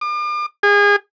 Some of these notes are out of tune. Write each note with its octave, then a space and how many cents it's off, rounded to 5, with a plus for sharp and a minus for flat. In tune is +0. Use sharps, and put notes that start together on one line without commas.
D6 +40
G#4 -30